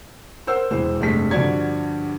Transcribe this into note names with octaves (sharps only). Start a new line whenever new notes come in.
A#4 C5 F#5 E6
E1 E3 G#3 C5
F1 G2 G#3 A3 B6
G2 D3 F3 F#4 D5 G#6